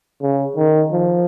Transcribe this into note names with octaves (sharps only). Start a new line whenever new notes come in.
C#3
D#3
F3